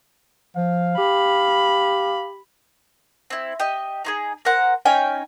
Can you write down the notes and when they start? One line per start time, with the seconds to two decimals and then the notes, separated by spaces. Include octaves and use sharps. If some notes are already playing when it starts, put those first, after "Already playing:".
0.56 F3 F5
0.98 G4 B5
3.30 C4 E4
3.60 G4 D#5
4.05 D#4 F4 G#4
4.45 A#4 C5 F#5
4.85 C#4 D#4 G5 G#5